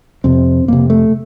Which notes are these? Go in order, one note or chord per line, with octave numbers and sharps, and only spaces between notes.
F2 C3 C4
F2 C3 A#3
A3